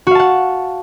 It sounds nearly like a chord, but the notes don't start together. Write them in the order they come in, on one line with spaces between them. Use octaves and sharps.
F#4 F5 A5 F#5